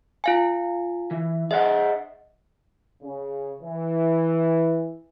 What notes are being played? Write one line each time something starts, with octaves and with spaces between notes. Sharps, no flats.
F4 F5 G#5
E3
G#4 D#5 E5 F#5
C#3
E3